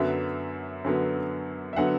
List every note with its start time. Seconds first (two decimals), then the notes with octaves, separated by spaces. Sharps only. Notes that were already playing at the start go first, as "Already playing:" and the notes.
Already playing: F#2 D3 F#3 B3 E5
0.85 F#2 D3 F#3 B3
1.73 E5
1.76 D3 F#3 B3 F#5